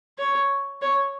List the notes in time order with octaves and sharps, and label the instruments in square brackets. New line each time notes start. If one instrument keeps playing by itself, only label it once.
[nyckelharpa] C#5
C#5